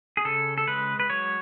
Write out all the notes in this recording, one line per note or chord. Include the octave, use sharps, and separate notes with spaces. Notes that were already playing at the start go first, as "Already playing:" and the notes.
G#4
C#3 A4
A4
G#3 B4
B4
F#3 C#5